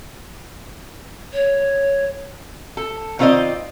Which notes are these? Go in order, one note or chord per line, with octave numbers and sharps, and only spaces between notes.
C#5
A4
D#3 C4 F4 B4 D5 D#5